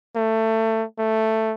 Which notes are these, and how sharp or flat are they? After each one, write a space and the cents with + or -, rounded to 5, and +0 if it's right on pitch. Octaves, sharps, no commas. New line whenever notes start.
A3 +20
A3 +5